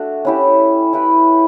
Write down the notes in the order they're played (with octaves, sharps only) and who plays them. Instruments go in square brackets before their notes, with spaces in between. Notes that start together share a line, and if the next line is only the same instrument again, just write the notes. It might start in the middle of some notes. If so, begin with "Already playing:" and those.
Already playing: [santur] A3 D4 F#4
C#4 E4 G4
E4 G4 B4